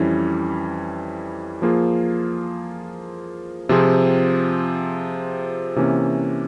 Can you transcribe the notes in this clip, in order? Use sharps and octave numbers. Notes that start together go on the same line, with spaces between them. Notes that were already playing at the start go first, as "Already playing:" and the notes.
Already playing: F2 E3 G3 C#4 E4
F3 A#3 F4 G#4
C3 F3 C4 F4 G#4
C3 E3 A#3 C#4